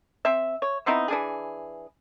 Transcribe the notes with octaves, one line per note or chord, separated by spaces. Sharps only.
C4 E5
C#5
B3 C4 D#4 E4
E3 D4 G#4